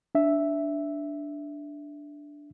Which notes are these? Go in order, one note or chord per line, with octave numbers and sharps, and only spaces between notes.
D4 E5